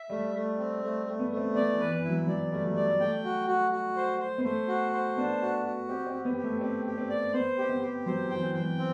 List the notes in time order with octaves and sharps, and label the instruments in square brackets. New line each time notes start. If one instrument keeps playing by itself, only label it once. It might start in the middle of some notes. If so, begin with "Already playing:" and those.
Already playing: [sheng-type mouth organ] E5
[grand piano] G3 [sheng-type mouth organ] A3
[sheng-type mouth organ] A3
C4
A3
A3
[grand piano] B3
[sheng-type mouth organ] A3
[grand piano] C4
[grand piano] B3 [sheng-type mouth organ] D5
[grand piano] E3
[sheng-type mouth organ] B4
[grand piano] E3
[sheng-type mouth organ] E4
[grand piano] F#3
[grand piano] F#3 [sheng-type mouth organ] D5
[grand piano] G3 [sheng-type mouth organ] A3
[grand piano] F#3
[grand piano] G3 [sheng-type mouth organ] D5
[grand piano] A3 [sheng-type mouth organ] G5
[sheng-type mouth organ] F#4
F#4
F#4
C5
C5
[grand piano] B3
[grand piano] A3 [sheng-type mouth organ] C5
[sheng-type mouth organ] F#4
C5
[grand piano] B3 [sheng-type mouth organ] D4
[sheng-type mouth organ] F#4
F#4
[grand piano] C4 [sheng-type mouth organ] G4
[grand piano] C4
[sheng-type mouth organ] G4
[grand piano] B3
[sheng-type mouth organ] G4
[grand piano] A3
[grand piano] C4 [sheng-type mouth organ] G4
[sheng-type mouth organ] G4
[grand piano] C4
[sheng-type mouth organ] D5
[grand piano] B3 [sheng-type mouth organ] C5
[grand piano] C4 [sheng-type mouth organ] G4
[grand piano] B3
[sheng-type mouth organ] G4
[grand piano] F#3 [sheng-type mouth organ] C5
[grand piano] E3
[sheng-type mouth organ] G5
[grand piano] F#3
E3
[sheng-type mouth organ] G5
[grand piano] F#3
[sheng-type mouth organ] C4